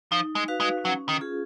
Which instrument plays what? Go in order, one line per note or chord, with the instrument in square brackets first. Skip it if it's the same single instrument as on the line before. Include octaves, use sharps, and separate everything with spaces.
[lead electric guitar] F3 [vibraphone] D#4
[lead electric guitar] G#3
[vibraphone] F#4 B4 F5
[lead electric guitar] G#3
[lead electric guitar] F#3 [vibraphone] C#4
[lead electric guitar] D#3
[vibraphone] F4 G#4